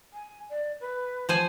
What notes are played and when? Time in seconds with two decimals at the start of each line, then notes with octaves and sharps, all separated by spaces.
0.13 G#5
0.50 D5
0.81 B4
1.29 F3 C5 G#5